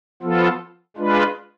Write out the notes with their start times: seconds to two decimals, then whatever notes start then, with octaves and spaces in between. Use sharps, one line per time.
0.22 F3 B3 F4 A4
0.97 G#3 D4 F4 B4